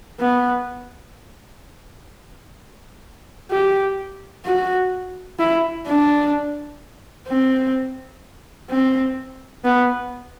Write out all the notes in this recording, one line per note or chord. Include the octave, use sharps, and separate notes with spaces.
B3
G4
F#4
E4
D4
C4
C4
B3